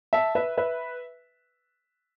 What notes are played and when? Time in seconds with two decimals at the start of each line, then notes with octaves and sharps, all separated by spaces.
0.13 E5 A5
0.35 B4 E5
0.57 B4 E5